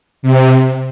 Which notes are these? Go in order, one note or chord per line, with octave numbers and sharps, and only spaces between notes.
C3